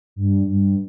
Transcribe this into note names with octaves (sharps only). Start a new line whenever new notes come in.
G2
G2